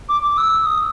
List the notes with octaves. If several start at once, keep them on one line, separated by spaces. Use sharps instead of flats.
D6
D6
E6
D#6